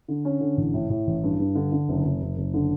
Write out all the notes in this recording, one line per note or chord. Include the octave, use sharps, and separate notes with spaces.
D3
C#4
D3
A1
A2
A2
A1
G2
G2
D3
D3
F#1
F#1
F#1
F#1
D3